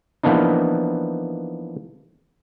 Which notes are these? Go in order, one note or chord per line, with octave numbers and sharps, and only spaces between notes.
E3 F3 A#3 B3 D4 D#4